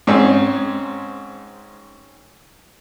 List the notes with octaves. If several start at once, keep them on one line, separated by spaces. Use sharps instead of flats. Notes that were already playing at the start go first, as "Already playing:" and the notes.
G#2 C4 C#4